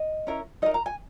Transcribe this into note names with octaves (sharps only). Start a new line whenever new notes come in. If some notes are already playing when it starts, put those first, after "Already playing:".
Already playing: D#5
C#4 E4 A#4
D#4 A#4 D#5
A#5
G#5